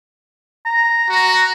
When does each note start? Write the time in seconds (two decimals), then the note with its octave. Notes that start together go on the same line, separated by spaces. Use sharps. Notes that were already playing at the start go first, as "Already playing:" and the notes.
0.66 A#5
1.10 F#4